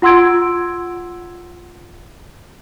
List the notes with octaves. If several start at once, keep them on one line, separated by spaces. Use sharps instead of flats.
F4 F#5 C6 E6 G#6 D7